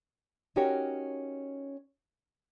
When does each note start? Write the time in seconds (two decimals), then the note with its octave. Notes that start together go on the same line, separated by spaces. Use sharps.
0.56 C#4 D#4 F#4 G4 A#4 C#5